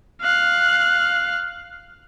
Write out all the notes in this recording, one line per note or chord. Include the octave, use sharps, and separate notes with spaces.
F5 F#6